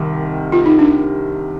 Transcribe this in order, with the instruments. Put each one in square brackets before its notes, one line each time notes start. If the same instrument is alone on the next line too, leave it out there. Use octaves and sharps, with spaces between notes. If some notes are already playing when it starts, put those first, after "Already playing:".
Already playing: [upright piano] C2 C3 D#3
[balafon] F4
D#4
D4